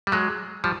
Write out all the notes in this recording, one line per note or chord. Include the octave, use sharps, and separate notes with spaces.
G3
F#3 G#3
F3 G3